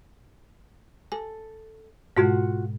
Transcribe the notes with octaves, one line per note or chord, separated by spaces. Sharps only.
A4 G#5
G#2 B2 G#3 F4 F#4 F#5